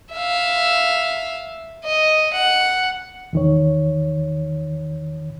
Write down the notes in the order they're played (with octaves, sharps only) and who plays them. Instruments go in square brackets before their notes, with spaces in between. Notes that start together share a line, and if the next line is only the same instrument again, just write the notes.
[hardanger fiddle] E5 F5
D#5
F#5
[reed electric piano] E2 D#3 C#5